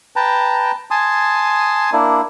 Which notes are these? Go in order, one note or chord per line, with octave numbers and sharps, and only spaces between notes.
B4 G5 A5 A#5
G#5 A5 C6 D#6
A#3 D4 E4